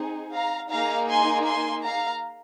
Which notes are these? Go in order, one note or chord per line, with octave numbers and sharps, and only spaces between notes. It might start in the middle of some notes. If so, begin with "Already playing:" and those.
Already playing: C4 D#4 G#4
F5 A#5
A#3 D#4 G#4 F5 A#5
G#5 C6
G#5 C6
F5 A#5